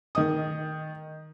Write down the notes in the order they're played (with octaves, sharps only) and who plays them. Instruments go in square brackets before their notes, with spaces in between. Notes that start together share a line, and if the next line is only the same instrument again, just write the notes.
[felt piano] D#3 D#5 D#6